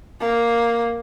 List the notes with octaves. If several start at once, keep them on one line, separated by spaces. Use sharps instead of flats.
A#3